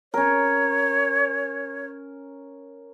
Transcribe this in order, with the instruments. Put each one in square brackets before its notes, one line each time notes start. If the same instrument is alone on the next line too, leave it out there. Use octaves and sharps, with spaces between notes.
[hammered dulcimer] C#4 A#4 [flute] C#5